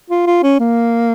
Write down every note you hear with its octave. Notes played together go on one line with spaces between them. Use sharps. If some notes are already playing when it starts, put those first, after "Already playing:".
F4
F4
C#4
A#3